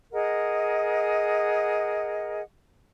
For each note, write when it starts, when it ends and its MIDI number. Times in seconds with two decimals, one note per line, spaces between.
0.13 2.42 68
0.13 2.42 70
0.13 2.42 75
0.13 2.42 78